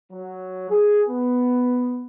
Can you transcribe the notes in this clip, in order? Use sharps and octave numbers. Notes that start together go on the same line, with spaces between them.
F#3
G#4
B3